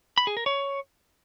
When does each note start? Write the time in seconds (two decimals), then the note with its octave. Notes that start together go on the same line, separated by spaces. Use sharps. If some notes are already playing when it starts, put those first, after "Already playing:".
0.18 B5
0.27 G#4
0.37 A#4
0.46 C#5